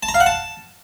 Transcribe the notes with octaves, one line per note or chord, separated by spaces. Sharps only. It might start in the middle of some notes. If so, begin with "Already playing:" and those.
A5
A#5
F5
F#5
A5